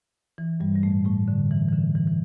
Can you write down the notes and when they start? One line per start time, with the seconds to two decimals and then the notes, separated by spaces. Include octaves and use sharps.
0.38 E3
0.60 G2 G3
0.76 G3
0.83 A2 A3
1.05 A2 A3
1.28 D3
1.51 E3
1.69 E3
1.73 D3
1.95 E3
2.08 E3